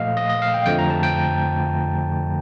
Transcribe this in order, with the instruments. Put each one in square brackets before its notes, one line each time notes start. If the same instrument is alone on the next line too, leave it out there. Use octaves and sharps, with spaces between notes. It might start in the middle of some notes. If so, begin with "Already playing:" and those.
Already playing: [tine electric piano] A#2 F3 A3 D#5 F5
D#5
D#5
F5
G5
F2 D3 F3 A3 G5
A#5
A5
G5